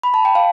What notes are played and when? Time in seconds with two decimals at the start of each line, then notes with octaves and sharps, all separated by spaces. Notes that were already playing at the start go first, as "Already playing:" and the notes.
0.03 B5
0.14 A5
0.25 G5
0.35 F5